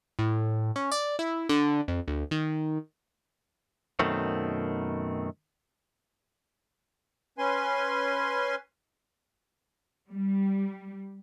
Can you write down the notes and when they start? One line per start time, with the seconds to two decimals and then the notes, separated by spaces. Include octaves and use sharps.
0.19 A2
0.76 C#4
0.92 D5
1.19 E4
1.49 D3
1.88 F2
2.08 D2
2.31 D#3
3.99 F#2 B2 D#3 A3 C4
7.38 C#4 B4 G#5 C6
10.11 G3